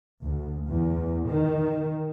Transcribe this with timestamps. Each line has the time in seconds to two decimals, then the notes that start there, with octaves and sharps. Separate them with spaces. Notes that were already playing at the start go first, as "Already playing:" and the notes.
0.23 D2
0.67 E2
1.29 D#3